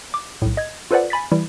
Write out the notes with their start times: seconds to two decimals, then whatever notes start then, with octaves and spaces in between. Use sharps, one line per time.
0.14 D6
0.42 B1 A2
0.57 D#5 G#6
0.91 F4 A4 B4 C5 D5 F#5
1.10 G#5 B5 A6 B6
1.32 E3 G3 E4